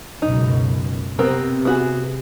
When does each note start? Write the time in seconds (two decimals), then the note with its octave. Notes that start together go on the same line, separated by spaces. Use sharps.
0.22 C#2 F#2 B2 D#4
1.19 C3 B3 C4 A#4
1.65 B3 F#4 G#4